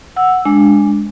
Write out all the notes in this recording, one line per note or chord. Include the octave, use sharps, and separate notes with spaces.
F#5 E6
G#3 D4